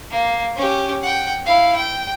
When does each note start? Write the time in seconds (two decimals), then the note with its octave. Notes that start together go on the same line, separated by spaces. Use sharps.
0.11 A#3
0.56 C#4 G4
1.03 F#5 G5
1.46 E4 F5
1.76 G5